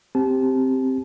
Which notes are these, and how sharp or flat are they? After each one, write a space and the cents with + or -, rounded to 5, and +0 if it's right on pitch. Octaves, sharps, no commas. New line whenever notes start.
C4 +0 G4 +0 A5 -30